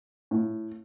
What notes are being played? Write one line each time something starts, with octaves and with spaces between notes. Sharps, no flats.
A2